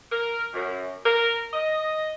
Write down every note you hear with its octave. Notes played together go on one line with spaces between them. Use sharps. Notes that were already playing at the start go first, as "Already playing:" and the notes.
A#4
F#2
A#4
D#5